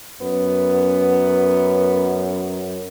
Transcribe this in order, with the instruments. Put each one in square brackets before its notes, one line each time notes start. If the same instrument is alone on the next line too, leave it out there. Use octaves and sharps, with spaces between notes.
[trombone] F#2 [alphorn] B3